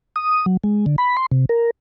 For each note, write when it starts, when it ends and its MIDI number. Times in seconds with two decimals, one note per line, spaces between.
0.16 0.46 87
0.46 0.57 54
0.64 0.86 56
0.86 0.96 50
0.98 1.16 83
1.17 1.26 84
1.32 1.45 48
1.49 1.70 70